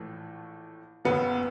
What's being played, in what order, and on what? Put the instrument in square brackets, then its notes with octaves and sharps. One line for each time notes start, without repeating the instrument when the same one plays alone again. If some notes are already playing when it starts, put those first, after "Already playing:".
Already playing: [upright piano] A#1 A2 E3 A3
[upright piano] F#1 F#2 C#3 F#3 [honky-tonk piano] B3